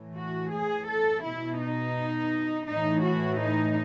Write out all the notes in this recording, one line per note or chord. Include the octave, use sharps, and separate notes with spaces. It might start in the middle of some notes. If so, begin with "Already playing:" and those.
Already playing: A2 E3
F#4
G#4
A4
B2 E4
D#4
A2 E3 D#4
F#4
D#4